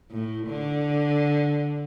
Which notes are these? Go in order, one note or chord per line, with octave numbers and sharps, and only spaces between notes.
A2
D3